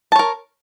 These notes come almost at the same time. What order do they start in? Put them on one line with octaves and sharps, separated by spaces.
A5 C#5 A#4